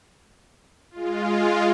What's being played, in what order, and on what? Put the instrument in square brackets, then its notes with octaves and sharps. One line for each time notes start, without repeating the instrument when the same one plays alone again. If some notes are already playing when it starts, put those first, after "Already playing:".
[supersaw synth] G#3 F4